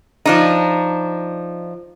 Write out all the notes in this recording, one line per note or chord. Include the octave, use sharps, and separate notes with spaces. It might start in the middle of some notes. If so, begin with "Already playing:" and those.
F3 D4 D#4